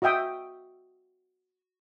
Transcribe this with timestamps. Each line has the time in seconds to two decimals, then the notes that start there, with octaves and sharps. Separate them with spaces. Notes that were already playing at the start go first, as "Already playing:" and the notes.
0.02 F#4 D#5 E5 G5 D#6